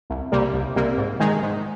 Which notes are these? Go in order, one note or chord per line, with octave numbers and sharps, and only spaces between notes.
C2
C3 G3 A#3
C2
C3 G3 A#3
G#2
D#3 G#3 D#4 G#4
G#2